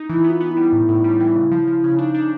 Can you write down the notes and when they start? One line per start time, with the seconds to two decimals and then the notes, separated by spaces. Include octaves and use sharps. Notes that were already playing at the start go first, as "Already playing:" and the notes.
Already playing: D#4
0.09 E3 E4
0.24 B3
0.30 F4
0.41 B3
0.51 E4
0.57 G3
0.73 A2
0.89 A2
1.04 G3
1.20 E3
1.36 C#3
1.51 F3
1.68 F3
1.84 C#3
1.99 D4 D#4
2.14 D4